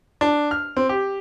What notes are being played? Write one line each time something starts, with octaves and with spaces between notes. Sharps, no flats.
D4
F6
C4
G4